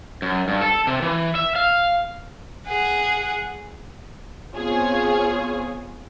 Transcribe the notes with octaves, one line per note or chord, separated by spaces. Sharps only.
F#2
G2
A4
C3
E3
E5
F5
G#4 F#5
B3 C4 F4 G#4 C#5